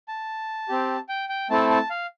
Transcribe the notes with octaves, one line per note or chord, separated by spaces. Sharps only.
A5
C4 G4
G5
G5
A3 C4 E4 A4 A5
A5
F5